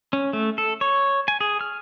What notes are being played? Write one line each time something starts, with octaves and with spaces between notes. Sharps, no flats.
C#4
A3
A4
C#5
G#5
G#4
F6